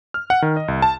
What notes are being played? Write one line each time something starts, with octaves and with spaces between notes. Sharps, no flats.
F6
F#5
D#3
D#5
C2
A5